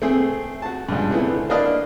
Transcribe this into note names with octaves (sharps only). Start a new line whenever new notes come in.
A3 C4 G#4
F#4 A5
C#2 G2
D3 A3 B3 C4 E4 G#4
A#3 D4 B4 D#5 F5 A5